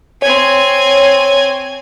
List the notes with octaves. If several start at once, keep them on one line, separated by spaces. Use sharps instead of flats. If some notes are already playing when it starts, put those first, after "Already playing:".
C4 C#5 G#5